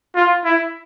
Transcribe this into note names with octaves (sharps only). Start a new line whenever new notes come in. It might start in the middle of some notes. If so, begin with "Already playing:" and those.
F4
E4